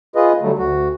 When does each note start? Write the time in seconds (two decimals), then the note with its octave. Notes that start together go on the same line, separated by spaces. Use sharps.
0.15 F4 G#4 B4 D#5
0.42 D3 F#3 G3 A3
0.59 D2 F#4